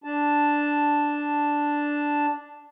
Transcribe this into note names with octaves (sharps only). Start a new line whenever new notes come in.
D4 A5